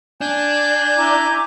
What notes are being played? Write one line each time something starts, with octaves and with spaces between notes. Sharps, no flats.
D4 G#5 G6
E4 A#5 D6